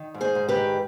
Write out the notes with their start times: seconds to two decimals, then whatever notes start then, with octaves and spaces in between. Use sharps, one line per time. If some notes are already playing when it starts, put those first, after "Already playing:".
Already playing: D#3
0.14 G#2
0.21 G#4 C5
0.35 G#2
0.48 G4 B4
0.56 D#3